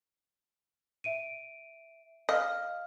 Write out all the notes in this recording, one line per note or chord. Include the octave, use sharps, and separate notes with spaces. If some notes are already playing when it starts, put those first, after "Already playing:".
E5 D7 D#7
D#5 F5 F6